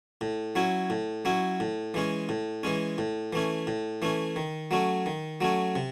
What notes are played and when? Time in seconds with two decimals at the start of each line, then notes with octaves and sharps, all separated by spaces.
0.21 A2
0.55 F#3 C#4 E4
0.90 A2
1.25 F#3 C#4 E4
1.60 A2
1.94 E3 G#3 C#4
2.29 A2
2.63 E3 G#3 C#4
2.98 A2
3.33 E3 A3 C#4
3.67 A2
4.02 E3 A3 C#4
4.36 D#3
4.71 F#3 A3 C#4
5.06 D#3
5.41 F#3 A3 C#4
5.75 C3